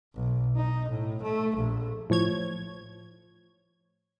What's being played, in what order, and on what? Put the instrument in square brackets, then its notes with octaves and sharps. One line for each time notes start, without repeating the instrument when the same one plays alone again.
[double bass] B1
D#4
A2
A3
A#1
[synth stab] A2 F3 C#5 G#6